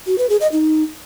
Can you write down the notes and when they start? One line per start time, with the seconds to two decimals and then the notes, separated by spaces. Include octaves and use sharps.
0.07 F#4
0.18 B4
0.29 G#4
0.41 D#5
0.52 D#4